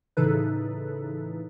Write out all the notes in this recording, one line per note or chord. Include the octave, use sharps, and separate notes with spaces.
A2 C#3 E3 D#4 A4 B4